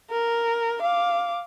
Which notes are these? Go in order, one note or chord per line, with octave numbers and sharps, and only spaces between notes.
A#4
F5 D6